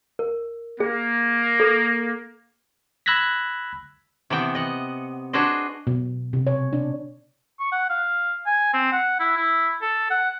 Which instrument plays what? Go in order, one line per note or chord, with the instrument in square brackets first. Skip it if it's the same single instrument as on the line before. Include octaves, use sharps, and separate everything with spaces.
[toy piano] A#4
[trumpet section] A#3 [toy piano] G#4
[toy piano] A4
[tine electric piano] B5 E6 F#6 G#6 A#6 B6
[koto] C3 E3 B3 G5
D#5 F#5
D4 F#4 G#4 B4 C5 D#5
[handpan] B2
C3
C#5
D4
[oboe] C#6
F#5
F5
G#5
C4
F#5
E4
E4
A4
F#5